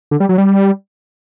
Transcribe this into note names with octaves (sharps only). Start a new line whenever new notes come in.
D3
G3
F#3
G3